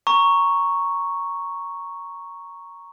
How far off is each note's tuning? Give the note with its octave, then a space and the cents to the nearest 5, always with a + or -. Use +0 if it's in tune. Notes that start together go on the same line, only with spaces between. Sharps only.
A#5 +0 C#6 +0